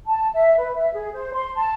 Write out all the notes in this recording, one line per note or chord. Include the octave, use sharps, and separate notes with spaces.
A5
E5
B4
E5
G#4
C5
C6
A5